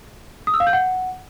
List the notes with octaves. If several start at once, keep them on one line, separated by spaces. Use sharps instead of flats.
D#6
E6
F5
G6
F#5